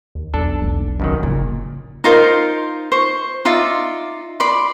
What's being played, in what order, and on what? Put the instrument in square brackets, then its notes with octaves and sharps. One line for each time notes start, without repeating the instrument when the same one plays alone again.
[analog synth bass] D#2
[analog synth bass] B1 [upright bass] E2 [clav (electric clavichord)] D4 A4
[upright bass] E1 B3
[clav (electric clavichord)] C#2 F#2 D#3
[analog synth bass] F1 [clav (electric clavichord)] A#2 [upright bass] C#3
[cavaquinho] D#4 F4 A#4 C5
C5 C#6
D#4 F4 D5 E5
D5 B5 C6